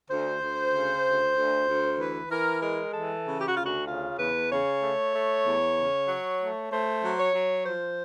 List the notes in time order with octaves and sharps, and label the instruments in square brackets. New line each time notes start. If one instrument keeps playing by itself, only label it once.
[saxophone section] D2 C5
D2
C#3
D2
D2
D2
E3 B4
E3 A#4
G#3 A#4
E3 A4
C#3
G4
F#4
D2 F4
F#4
C#3 F4
E2 B4
C#3 C#5
A3
A3
E2
C#3
F#3
A3
A3 C5
F#3
C#5
F#3
F3 C5